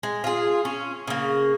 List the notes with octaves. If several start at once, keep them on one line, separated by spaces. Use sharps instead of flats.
G#3
F4 G#4
C#4
C#3 A#3